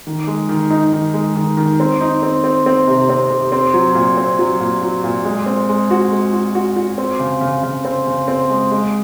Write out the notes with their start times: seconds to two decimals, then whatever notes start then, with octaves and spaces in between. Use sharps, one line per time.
0.07 D#3
0.27 G#3
0.49 D#3
0.70 D#4
0.93 D#3
1.14 G#3
1.35 D#3
1.57 D#3
1.80 C4
2.01 D#4
2.23 C4
2.44 C4
2.66 C4
2.87 C3
3.09 C4
3.31 C3
3.52 C4
3.74 F#3
3.95 A#2
4.17 C4
4.39 F#3
4.61 A#2
4.82 F#3
5.04 A#2
5.25 G#3
5.46 C4
5.69 G#3
5.91 F#4
6.12 G#3
6.33 F#4
6.55 F#4
6.76 F#4
6.98 C4
7.19 C#3
7.41 C#3
7.63 C#3
7.85 C4
8.07 C#3
8.28 C4
8.50 G#3
8.71 G#3